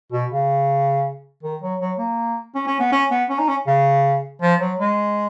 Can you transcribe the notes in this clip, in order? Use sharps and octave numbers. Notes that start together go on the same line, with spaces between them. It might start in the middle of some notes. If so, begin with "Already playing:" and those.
B2
C#3
D#3
F#3
F#3
A#3
C#4
C#4
B3
C#4
B3
C#4
D#4
C#4
C#3
F3
F#3
G#3